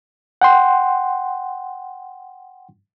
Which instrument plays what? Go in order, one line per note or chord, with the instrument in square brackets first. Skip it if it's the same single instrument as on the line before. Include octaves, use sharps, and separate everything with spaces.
[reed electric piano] F#5 G5 C6